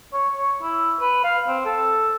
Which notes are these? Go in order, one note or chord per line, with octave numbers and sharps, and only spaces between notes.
C#5
C#5
E4
B4
F5
C4
A4